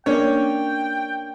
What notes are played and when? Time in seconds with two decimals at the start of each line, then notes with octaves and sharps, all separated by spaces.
0.06 A#3 C#4 D4 C#5 G5